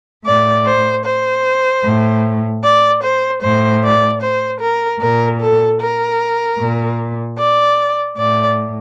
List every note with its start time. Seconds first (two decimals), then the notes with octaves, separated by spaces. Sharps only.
0.25 A2 D5
0.65 C5
1.04 C5
1.84 A2
2.63 D5
3.02 C5
3.41 A2 C5
3.82 D5
4.21 C5
4.60 A#4
5.00 A#2 A#4
5.40 A4
5.80 A#4
6.59 A#2
7.38 D5
8.17 A2 D5